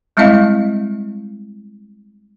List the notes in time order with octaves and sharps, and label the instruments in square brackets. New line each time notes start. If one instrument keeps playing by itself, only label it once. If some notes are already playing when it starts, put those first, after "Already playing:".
[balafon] G3 G#3 C4 E4 D#5 F5